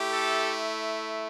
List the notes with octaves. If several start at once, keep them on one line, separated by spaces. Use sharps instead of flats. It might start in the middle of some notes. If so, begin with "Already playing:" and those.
Already playing: A3 E4 G4
A4